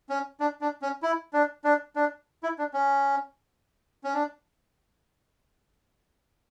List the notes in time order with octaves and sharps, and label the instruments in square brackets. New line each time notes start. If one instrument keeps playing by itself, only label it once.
[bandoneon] C#4
D4
D4
C#4
E4
D4
D4
D4
E4
D4
C#4
C#4
D4